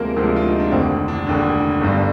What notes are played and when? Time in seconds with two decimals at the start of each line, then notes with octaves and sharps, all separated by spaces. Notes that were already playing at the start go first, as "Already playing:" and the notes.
Already playing: D2 C3 F3 G#3 A#3 A#4
0.16 D2 C3 F3 G#3 D4
0.36 F4
0.48 D#4
0.60 D4
0.71 F1 D#2 D3 C4
1.08 D4
1.26 F1 D#2 D3
1.82 G1 G2 D3